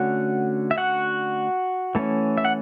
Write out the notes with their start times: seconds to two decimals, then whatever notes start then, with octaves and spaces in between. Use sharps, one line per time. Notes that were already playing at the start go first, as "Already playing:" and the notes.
Already playing: D3 A3 C#4 F#4 F#5
0.71 E5
0.78 F#4 F#5
1.95 E3 A3 C#4
2.38 E5
2.45 F#5